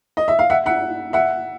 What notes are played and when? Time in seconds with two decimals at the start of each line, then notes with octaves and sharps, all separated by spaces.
0.17 D#5
0.28 E5
0.39 F5
0.50 E5 F#5
0.66 E5 F#5
1.13 E5 F#5